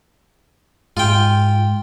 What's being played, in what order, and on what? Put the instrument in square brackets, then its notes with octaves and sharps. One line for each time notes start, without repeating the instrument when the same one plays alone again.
[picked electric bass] G#2 [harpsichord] F4 G5